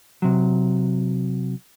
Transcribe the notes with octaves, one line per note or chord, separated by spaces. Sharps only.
C3 F#3